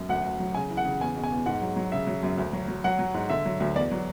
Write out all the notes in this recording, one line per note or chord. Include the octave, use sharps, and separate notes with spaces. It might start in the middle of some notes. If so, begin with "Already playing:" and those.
Already playing: F#2
D2 F#5
D2
F#3
C#3 G#5
E3
F#5
C#3
E2 G#5
B2
G#5
E2
G#2 F#5
F#3
F#3
C#3 E5
F#3
F#2
D2
F#3
F#3
F#3 F#5
F#3
G#2
D3 E5
F#3
D2
E2 D5
F#3